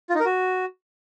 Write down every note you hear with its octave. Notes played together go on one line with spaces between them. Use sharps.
F4
D#4
A#4
F#4